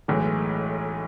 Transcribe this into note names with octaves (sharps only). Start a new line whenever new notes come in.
B1 A2 E3 G#3